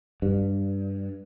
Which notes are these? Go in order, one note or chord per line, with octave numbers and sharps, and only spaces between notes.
G2